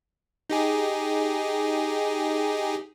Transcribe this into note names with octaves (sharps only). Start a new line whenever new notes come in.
D#4 G4 G#4